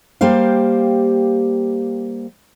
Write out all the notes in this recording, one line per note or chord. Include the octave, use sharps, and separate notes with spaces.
G3 A#3 G4 C5 F5